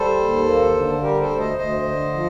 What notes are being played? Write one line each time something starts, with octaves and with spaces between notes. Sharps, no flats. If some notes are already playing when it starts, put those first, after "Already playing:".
Already playing: G3 A4 C5
D#2
A#3
D3
G3 G4 A#4
A4 C5
D2
C5 D#5
D2 C5 D#5
D3
F3